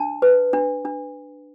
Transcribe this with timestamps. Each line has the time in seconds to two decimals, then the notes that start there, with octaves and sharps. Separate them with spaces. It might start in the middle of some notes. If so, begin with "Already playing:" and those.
Already playing: D4 A5
0.22 B4
0.53 D4
0.85 D4